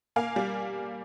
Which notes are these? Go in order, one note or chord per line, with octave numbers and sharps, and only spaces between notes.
A#3 F5 G#5
G3